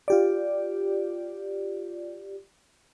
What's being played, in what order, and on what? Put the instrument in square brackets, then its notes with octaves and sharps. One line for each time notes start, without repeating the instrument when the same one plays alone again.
[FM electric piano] F4 G4 D5